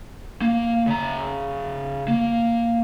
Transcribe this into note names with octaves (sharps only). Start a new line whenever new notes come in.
A#3
C#3 A#5
A#3